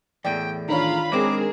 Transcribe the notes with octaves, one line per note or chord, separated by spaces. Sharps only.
E2 A2 D5 G5
D#3 D4 F4 C#5 F5 A#5 B5
G#3 C4 G#4 A#4 D6